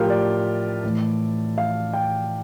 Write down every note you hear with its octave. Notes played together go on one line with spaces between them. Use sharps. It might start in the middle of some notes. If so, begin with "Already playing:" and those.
Already playing: A2 F3 F4 G4 A#4
D5
A2 E3
F5
G5